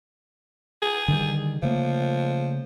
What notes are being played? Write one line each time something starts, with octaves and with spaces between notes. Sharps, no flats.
G#4
D3 D#3 G3
C#3 F3 A3 A#3